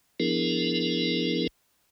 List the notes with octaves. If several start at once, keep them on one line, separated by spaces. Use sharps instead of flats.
F3 B3 D4 E4 G#4 A#4